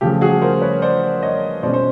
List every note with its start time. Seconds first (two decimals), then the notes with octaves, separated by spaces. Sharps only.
0.01 C#3 F3 A3 G4
0.21 F#4 G#4
0.42 A#4 C5
0.62 B4 C#5
0.82 C5 D5
1.23 C#5 D#5
1.63 B2 G#3 C#4 C5 D5
1.74 C5